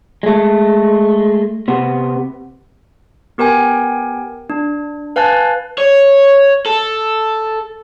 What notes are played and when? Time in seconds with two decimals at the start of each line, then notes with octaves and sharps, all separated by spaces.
0.23 G#3 A3
1.68 C3 B3
3.38 B3 G4 A#4 G5 G#5
4.50 D4
5.16 B4 F5 G#5 A5 F#6 A6
5.78 C#5
6.66 A4